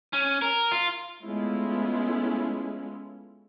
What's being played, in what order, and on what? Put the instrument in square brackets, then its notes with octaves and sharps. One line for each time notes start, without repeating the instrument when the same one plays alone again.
[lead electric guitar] C#4
A#4
F4
[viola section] G#3 A3 B3 C#4 E4 F4